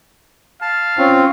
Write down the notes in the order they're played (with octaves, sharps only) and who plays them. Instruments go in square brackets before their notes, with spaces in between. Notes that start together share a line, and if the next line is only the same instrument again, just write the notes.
[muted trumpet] F5 [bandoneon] A5
[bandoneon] C4 F4 [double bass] C#4